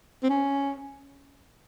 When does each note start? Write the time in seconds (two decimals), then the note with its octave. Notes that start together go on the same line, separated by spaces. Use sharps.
0.23 C4
0.29 C#4